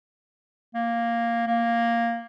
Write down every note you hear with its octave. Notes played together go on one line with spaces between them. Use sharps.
A#3
A#3